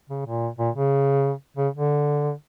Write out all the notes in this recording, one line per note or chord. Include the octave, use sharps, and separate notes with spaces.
C#3
A#2
A#2
C#3
C#3
D3